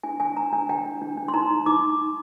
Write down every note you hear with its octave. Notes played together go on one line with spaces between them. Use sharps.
D4 G#5
D4 G#5
D4 A#5
D4 G#5
D4 G5
D4
D4
D4
C6
D#4 A#5
D#4
D#4 D6